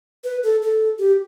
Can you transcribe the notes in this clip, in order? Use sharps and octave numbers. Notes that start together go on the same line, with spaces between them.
B4
A4
A4
G4